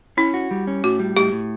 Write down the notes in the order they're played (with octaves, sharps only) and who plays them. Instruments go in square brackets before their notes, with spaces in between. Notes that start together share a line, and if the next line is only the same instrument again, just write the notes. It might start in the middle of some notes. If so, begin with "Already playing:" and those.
[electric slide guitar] C#4 [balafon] E4
[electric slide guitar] F#4
G3
C#4
[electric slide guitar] A2 [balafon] F#4
[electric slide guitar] G3
[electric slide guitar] A2 [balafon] G4
[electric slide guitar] A2